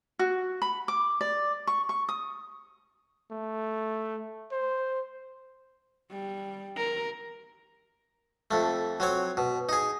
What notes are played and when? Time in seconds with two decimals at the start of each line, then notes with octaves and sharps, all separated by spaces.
0.19 F#4
0.62 B5
0.88 D6
1.21 D5
1.67 C#6
1.89 C#6
2.09 D#6
3.31 A3
4.52 C5
6.11 G3
6.77 A#4
8.51 F2 A3
9.00 F#3 C4 C#5
9.37 B2
9.69 D#4 G#4